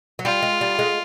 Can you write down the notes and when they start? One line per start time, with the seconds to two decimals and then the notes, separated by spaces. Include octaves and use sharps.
0.19 F#3
0.25 G3 F4
0.42 G#3
0.61 G3
0.79 G#3